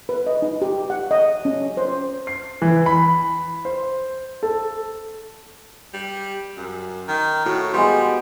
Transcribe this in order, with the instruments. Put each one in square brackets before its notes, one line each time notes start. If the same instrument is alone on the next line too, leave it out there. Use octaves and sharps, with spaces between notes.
[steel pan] B4
D#5
D#4
G4
F#5
D#5
C#4
C5
[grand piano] C7
E3
B5
C5
A4
[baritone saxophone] G3
F#2
D#3
[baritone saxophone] A2 [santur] F#4
[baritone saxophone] G3 [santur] G#3 B3 C5